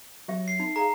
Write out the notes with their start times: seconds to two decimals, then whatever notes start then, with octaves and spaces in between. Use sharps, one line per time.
0.28 F#3 G4 E5
0.48 C7
0.60 D#4
0.76 G#4 F5 A#5